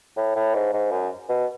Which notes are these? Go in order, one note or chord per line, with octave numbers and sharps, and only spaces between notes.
A2
A2
G#2
G#2
F#2
B2